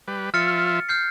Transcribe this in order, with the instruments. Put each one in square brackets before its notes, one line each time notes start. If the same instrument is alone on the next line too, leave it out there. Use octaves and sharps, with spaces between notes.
[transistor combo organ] G3 B4
[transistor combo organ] F3 F4 E5 [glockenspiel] F6 A6 C#7
[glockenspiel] F6 G6 C7